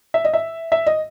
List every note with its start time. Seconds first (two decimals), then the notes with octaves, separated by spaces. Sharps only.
0.14 E5
0.25 D#5
0.34 E5
0.72 E5
0.87 D#5